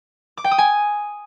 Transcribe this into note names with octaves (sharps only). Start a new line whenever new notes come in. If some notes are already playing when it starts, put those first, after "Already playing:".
D6
G5
D#6
G#5